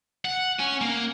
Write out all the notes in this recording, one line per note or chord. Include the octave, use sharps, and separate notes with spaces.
F#5
C#4 G#5
A#3